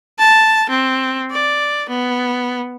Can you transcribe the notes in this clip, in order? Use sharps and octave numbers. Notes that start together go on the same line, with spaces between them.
A5
C4
D5
B3